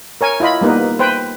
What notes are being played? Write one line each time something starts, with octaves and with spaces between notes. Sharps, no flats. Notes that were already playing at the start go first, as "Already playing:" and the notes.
A#4 C#5 G#5
E4 F4 D#5 B5
G3 A#3 B3 D#4 B4
B4 C5 G5